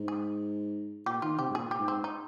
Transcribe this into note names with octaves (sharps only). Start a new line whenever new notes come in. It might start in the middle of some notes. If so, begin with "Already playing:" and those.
Already playing: G#2
G#4
A#2 G4
D#3 F4
C3 G4
G#2
A#2 G#4
G4
G#2
C4
D#4